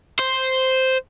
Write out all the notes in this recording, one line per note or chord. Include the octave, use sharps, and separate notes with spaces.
C5